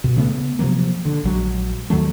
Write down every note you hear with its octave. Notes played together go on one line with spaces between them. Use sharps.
B2
C#3 A3 B3
C3 F3 F#3 A#3
D3
A#1 F#3 G#3
D#2 D#3 F#3 A3